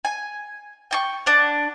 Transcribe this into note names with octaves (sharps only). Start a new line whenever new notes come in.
G#5
G5 G#5 C#6
D4 F#5